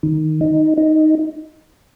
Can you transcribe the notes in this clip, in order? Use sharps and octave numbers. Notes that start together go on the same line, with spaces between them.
D#3
D#4
D#4